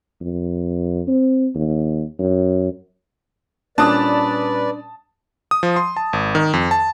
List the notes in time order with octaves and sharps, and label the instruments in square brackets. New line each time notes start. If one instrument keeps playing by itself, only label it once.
[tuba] F2
C4
D#2
F#2
[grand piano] A#2 G3 C#4 [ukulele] D4 [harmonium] B4 D5 [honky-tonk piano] A5 D#6
[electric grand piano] D#6
F3
C6
A5
G#1
D#3
F2
A5